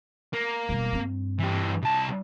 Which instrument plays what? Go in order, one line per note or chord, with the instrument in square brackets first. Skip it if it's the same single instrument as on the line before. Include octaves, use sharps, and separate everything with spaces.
[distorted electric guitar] A#3
[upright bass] E1 G3
G2 C4
[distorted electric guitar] E3 G4
C2 A5